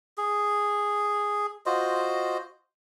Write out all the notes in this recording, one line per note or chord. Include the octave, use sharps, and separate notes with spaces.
G#4
F4 F#4 C5 D#5